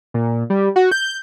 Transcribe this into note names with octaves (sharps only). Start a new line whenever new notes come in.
A#2
G3
F#4
G6